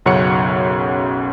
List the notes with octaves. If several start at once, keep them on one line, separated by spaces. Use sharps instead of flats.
B1 F#2 C#3 C#5 F#5 C#7